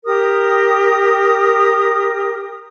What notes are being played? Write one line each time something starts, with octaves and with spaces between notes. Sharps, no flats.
G4 A#4 D#6